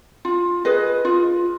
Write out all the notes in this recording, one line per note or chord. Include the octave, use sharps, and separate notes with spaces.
F4
G#4 B4 D#5
F4